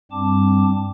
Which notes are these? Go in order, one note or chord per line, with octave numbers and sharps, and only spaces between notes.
G2 G3 C4 A5 D6